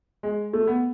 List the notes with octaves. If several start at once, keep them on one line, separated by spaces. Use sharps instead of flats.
G#3
A3
B3